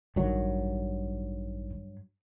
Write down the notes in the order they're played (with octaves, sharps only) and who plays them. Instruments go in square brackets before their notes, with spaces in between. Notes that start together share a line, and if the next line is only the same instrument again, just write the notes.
[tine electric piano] A1 D#3 [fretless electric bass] G2 F#3